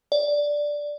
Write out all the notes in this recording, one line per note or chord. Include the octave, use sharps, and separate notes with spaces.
D5